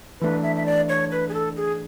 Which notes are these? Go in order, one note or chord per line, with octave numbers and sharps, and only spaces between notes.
E3 A3 D4 B4
E5
E5
D5
C#5
B4
G#4
A4
G#4